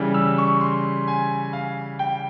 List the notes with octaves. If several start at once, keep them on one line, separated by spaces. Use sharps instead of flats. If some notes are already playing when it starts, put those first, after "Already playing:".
Already playing: C#3 E3 G3
E6
C#6
C6
G#5
F5
G5